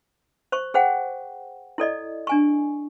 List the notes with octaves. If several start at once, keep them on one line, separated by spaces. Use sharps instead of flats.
C5 C#6
G#4 C5 F#5 G5
E4 A4 D5 D#5
D4 G#5 C#6